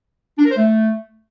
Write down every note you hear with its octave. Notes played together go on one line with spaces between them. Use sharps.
D4
A#4
C5
A3